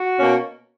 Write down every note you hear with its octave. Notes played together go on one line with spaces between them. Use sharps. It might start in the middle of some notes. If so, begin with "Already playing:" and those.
Already playing: F#4
B2 A#3 C#4